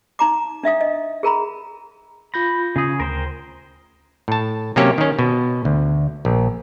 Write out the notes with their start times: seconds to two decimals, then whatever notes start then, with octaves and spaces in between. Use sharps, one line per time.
0.19 D#4 A#5 D6
0.64 D4 E5 F5 D#6
0.81 D#5
1.23 G#4 A#4 A#5 B5
2.34 F4 B5 G6 A#6
2.76 C#3 G#4
3.00 D2 A#4 C5 G5
4.28 A2 A5
4.76 C3 F#3 A#3 C#4 G4 C#5
4.98 D#3 C#4
5.19 B2
5.65 D2
6.25 A#1